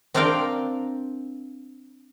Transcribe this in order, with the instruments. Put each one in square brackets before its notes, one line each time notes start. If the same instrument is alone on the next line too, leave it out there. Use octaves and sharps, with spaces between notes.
[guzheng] C4 D4 A#4 D5 F5 G5